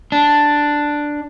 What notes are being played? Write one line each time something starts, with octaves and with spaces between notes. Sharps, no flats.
D4